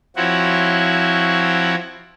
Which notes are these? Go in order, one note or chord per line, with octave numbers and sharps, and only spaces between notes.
F3 C4 E4 F#4 C#5